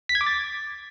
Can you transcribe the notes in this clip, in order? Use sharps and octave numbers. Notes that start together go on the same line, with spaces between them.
B6
G#6
D6
A6